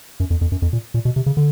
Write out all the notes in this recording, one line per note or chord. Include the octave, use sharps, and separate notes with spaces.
F#2
F2
F2
F#2
F2
A#2
A#2
B2
C3
C#3
D3